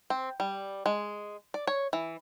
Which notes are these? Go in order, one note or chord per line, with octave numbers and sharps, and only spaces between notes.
C4
G3
G#3
D5
C#5
E3